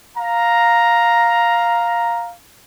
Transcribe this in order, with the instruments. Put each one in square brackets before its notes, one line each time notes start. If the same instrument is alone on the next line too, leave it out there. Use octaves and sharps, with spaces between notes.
[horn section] F5 A#5